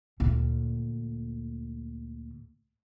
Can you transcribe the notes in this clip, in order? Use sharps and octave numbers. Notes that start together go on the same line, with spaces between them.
D2 A#2